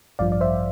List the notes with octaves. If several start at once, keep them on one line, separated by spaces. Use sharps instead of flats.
A1 G2 F3 D5 F5
D5
C5 E5